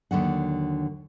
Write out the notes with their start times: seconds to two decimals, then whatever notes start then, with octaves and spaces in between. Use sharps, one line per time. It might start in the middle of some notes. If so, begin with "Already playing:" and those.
0.11 D#2 D3 F#3 F#5